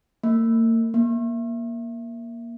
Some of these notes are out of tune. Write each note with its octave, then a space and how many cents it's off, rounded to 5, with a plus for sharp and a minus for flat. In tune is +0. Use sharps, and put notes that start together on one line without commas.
A#3 -40
A#3 +15